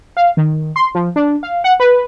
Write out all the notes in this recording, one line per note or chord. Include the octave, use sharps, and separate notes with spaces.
F5
D#3
C6
F3
D4
F5
F#5
B4